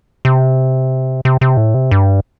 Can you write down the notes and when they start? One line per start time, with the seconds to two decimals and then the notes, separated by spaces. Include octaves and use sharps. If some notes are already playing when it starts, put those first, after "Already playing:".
0.25 C3
1.25 C3
1.41 C3
1.57 A2
1.74 C3
1.91 G2